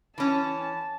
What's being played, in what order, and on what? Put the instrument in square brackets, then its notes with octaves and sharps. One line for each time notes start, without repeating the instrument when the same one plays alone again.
[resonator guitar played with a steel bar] E3 C#4 [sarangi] A5